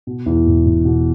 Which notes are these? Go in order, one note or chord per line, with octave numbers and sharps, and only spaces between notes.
B2
E2
E1
E1
B2